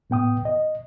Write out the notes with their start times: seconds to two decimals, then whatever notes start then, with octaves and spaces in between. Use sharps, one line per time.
0.10 A2 B3 G5 D#6
0.45 D#5